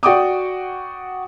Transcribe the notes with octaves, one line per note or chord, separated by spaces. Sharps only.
F#4 D5 G5 D6 D#6